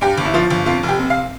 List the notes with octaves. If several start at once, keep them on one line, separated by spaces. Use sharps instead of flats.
G2 G4
G1
E4
F3 F4
G1
F2 F4
F1
G4
C3
F5